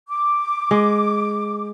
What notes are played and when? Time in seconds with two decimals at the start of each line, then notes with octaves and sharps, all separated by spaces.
0.09 D6
0.71 G#3